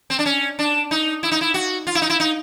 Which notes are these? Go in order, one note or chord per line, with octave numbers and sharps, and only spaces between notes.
C4
D4
C#4
D4
D#4
E4
D#4
E4
F#4
F4
E4
D#4
E4
D#4